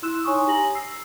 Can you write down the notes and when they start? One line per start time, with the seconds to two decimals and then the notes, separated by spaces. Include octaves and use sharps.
0.02 E4 C6 E6 F#6 E7
0.24 D#4 C#5 G#5 C6 C#6 D#6
0.47 G4 G#5 A#5 A#6 F#7
0.75 E6 C7